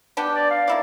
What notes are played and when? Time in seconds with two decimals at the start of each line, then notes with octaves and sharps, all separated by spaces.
0.17 B3 D4 G4
0.35 D5
0.50 F5
0.68 A#3 E4 D5